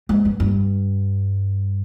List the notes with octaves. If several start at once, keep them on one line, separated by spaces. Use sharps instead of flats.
G#2
G2
G2